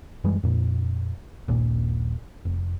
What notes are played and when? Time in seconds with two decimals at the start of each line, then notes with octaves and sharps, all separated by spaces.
0.24 F#2 E3 G3 G#3
0.43 F2 A#2
1.48 D#1 A#1 A#2
2.45 F1